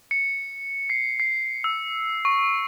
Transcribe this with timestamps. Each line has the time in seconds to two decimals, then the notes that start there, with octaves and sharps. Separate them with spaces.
0.11 C#7
0.90 C7
1.20 C7
1.64 E6
2.25 C#6